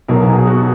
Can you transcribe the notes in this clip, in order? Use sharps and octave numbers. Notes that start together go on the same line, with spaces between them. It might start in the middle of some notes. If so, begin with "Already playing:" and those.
B1 B2 F#3 A#4
G#4
F#4